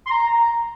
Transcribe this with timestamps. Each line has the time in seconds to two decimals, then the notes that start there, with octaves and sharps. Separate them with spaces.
0.06 C6
0.11 A#5
0.28 A#5